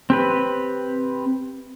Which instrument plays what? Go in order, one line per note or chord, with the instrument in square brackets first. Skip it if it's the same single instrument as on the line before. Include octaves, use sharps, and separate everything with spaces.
[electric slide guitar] C4 G4 B4